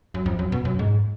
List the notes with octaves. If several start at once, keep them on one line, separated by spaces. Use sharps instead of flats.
F#2
F2
F#2
B2
F#2
G#2